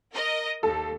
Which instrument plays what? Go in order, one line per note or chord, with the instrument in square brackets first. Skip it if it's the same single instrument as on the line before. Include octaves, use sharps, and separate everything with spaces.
[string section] A#4 D#5
[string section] D#2 [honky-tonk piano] A4